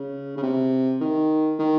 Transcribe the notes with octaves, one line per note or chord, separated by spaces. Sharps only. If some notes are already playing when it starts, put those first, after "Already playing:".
Already playing: C#3
C#3
C3
D#3
D#3